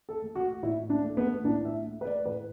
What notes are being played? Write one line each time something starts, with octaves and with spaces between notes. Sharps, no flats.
A4
A3
F#4
A2 E4
D4
A3
B3
A2 D4
E5
A3
B4
D5
A2 B4